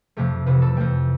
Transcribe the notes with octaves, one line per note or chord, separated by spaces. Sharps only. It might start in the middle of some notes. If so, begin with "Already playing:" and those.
F2 C3 F3 A3 G4
F2 C3 E3 B4
A4
F2 E3 A3 G5